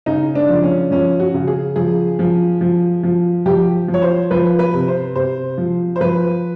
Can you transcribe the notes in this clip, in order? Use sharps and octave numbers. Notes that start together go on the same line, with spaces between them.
C#3 D#4
D4
F3
C#4
F3 C#4
F#4
C#3
G#4
F3 G#4
F3
F3
F3
F3 G4
F3
C#5
C5
F3 B4
B4
C3
C5
C3 C5
F3
C5
F3 B4